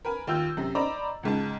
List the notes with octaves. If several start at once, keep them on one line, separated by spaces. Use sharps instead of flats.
A#4 B4 G#5
D#2 F4 G5 E6 G6
F#2 C3
C5 D5 D#5 A#5 B5 D6
C#2 G#2 A5